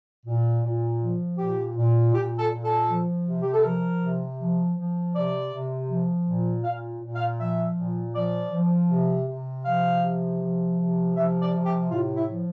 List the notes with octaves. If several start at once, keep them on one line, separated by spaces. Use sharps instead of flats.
A#2
A#2
F3
A#2 G4
A#2
A#2 G4
A4
A#2
A4
F3
C3
G4
A4
F3 A#4
C3
F3
F3
C3 D5
C3
F3
A#2
A#2 F5
A#2
F5
F3 E5
A#2
F3 D5
F3
C3
C3
F3 F5
C3
F3
C3
F3 E5
D5
C3
G4
A2 F4
E4
F3